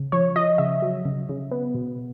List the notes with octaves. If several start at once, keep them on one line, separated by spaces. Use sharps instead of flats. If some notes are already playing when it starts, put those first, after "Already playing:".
Already playing: C#3
F3 C#5
F3 D#5
C#3 E5
F#3
C#3
C#3
B3
B2